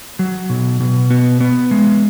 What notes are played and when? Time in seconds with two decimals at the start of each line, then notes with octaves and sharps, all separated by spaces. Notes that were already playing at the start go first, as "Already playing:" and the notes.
0.19 F#3
0.50 B2
0.80 B2
1.10 B3
1.40 B3
1.71 G#3